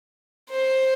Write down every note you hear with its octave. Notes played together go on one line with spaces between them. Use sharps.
C5